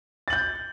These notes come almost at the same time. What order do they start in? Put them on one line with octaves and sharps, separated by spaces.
A6 F#7 G6